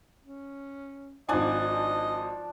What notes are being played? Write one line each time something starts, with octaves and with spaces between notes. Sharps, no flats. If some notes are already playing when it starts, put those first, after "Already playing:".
C#4
G#1 F3 D4 D#4 D5 D#5 G#5